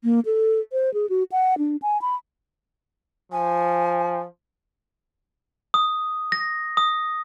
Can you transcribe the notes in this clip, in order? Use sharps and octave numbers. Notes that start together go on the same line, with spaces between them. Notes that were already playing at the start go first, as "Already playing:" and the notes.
A#3
A4
C5
G#4
F#4
F#5
D4
G#5
B5
F3 G#5
D#6
A#6
D#6